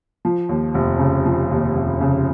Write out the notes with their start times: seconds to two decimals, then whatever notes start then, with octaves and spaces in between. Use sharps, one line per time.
0.25 F3
0.49 D#2
0.74 F1
0.99 C#3
1.25 F3
1.51 D#2
1.76 F1
2.01 C#3